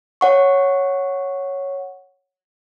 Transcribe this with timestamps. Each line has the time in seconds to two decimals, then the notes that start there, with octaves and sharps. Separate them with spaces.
0.21 C#5 F#5 C#6